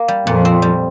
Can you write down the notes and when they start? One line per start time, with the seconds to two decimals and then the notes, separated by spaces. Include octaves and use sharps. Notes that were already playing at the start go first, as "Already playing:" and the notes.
Already playing: A#3
0.08 G3
0.27 F2 A#2
0.45 C4
0.62 G3